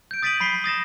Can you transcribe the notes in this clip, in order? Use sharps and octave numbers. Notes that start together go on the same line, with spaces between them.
G6 D7
D#6 A6 B6 D7 D#7 F#7
B5 B6 C7 G7
D#6 A6 A#6 E7